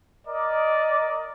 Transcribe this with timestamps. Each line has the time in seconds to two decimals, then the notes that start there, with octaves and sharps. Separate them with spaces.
0.27 A#4 D5 D#5